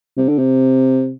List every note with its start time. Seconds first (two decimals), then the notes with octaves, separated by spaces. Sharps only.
0.17 C3
0.29 D3
0.38 C3